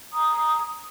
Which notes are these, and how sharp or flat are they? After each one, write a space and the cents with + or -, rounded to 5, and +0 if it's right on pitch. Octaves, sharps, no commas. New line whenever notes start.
A#5 +5 D#6 +0